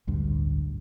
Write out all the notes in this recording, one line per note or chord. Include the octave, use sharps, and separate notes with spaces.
A1 D2 G2